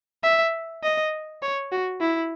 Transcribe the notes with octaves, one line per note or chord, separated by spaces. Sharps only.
E5
D#5
C#5
F#4
E4